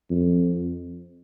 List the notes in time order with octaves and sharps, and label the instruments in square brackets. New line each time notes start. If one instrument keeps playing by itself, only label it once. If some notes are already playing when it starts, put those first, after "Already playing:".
[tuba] F2